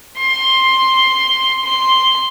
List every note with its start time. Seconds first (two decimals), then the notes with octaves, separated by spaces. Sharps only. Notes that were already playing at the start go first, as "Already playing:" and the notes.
0.18 C6
1.64 C6